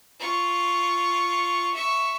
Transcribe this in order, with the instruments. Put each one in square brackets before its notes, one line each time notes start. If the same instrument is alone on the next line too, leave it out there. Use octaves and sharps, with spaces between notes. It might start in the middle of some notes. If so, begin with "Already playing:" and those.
[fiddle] F4 C#6
E5 C#6